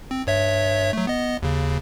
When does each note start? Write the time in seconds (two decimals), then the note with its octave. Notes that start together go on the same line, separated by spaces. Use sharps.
0.11 C4
0.27 G2 C#5 E5
0.93 F#3 A3
1.07 B3 D#5
1.43 D#2 C#3